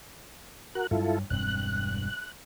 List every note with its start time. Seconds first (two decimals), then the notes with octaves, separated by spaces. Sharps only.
0.75 F#4 A#4 F#6
0.91 G2 F#3 E4 F4 A4
1.30 E1 G2 C4 F#6